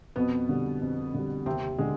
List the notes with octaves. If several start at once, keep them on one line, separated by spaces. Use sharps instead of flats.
F2 B2 B3
D3 G3
F2
D3 G3
D#2 C3 C4
D3 G#3